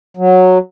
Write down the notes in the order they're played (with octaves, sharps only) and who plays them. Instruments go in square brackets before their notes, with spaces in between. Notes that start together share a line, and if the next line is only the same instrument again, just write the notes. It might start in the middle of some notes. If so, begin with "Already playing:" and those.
[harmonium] F#3